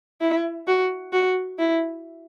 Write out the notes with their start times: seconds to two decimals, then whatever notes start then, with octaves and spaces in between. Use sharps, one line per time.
0.21 E4
0.67 F#4
1.12 F#4
1.58 E4